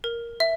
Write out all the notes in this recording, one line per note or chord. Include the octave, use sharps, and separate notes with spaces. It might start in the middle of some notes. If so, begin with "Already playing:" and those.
A#4
E5